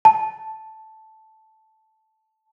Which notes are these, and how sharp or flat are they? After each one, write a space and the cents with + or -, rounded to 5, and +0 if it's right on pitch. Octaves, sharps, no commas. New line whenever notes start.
A5 -5